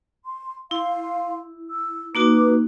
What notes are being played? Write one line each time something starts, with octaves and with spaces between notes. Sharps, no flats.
C6
E4 F5 C6
E6
A#3 D#4 F#4 B4 D6